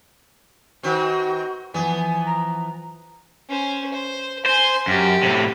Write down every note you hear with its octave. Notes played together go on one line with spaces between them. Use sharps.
D#3 C4 F#4
E3 F3 B3 G#5
A#5
C#4 C5
C5
C5 G#5 C6
F#2 G4
A2 C3